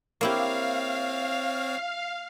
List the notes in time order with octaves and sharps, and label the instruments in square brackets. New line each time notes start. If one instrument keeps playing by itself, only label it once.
[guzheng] A#3 E4 G4 [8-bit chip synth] C4 C#5 [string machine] F5